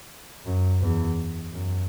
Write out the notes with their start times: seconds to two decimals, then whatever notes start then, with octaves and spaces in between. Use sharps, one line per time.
0.46 F#2
0.81 E2
1.53 F#2